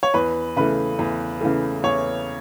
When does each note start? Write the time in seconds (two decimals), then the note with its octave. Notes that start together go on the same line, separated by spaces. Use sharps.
0.03 C#5
0.14 E2 B4
0.57 C#3 E3 A3 B4
0.99 E2
1.41 C#3 E3 A3
1.84 E2 C#5